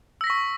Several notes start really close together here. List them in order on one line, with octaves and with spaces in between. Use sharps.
E6 A#6 B6 C#6